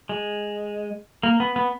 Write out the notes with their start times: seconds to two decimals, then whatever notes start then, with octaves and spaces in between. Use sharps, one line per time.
0.09 G#3
1.23 A#3
1.40 B3
1.56 B3